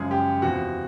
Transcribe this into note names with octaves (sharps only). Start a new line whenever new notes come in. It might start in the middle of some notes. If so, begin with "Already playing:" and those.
Already playing: F#2 C#3 F3 G#3 G#4
G4
E2 C3 F3 F#4